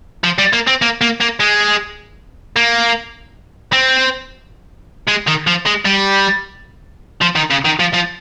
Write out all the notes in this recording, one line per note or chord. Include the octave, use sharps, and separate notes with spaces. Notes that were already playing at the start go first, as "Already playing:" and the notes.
F3
G3
A#3
C4
A#3
A#3
A#3
G#3
A#3
C4
G#3
D#3
F3
G#3
G3
F3
D#3
C#3
D#3
F3
F3